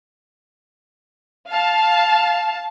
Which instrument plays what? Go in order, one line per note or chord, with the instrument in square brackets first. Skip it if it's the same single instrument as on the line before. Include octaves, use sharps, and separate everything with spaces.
[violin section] F5 A5